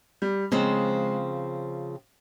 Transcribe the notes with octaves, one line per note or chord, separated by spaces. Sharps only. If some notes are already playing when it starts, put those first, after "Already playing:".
G3
C#3 F3 G#3 C4